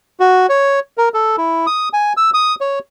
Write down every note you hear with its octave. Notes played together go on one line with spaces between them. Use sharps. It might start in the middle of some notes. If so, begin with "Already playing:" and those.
F#4
C#5
A#4
A4
E4
D#6
G#5
E6
D#6
C#5